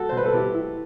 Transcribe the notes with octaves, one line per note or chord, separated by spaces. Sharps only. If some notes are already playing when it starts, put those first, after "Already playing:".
Already playing: F#4 A4
C5
B2 B4
A4
B2 E4 G4
E4